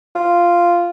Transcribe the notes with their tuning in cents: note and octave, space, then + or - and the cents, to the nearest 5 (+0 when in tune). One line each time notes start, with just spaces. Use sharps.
F4 -5